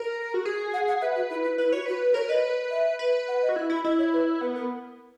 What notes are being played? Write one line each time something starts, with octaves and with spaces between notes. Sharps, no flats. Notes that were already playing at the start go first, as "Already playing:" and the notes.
Already playing: A#4
F#4
G#4
F#5
F#5
B4 E5
F#4
E4
E4
E4 B4
F#4 C#5
F#4 B4
A#4 C#5
B4 D#5
E5
B4
F#5
D#5
F#4
E4
E4
E4 D#5
C#5
B4
B3 B4
A#4